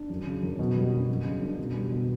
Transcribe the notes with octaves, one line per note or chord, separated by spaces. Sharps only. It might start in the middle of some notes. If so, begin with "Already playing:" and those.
Already playing: D4
F#2
C#3
F#2
B2
G3
D4
F#2
C#3
D4
B2
G3
B2